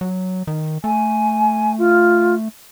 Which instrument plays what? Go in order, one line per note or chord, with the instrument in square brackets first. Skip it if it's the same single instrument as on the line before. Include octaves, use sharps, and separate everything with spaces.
[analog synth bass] F#3
D#3
[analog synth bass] A3 [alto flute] G#5
[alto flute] F4